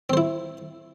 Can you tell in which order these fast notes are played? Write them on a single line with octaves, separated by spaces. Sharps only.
C4 C5 E4